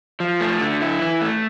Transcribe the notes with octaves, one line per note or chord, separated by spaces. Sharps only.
F3
A3
D3
E4
E3
A3